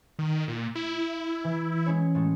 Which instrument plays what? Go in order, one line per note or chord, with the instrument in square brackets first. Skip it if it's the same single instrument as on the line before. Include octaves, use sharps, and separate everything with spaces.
[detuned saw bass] D#3
A#2
E4
[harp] E3
G#3 C#4 C#5
A2 G#3 A3